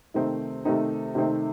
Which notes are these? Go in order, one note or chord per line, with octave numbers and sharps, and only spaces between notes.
C3 D#3 A3 C4 D#4
C3 D#3 A3 C4 D#4
C3 D#3 A3 C4 D#4